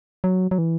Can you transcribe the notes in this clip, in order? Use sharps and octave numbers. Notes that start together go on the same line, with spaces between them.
F#3
F#3
E3